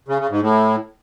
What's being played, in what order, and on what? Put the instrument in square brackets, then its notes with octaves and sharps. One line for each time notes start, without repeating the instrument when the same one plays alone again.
[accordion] C#3
C#3
G#2
A2